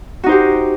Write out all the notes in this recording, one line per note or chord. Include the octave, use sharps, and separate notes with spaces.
D#4 F#4 G4 C5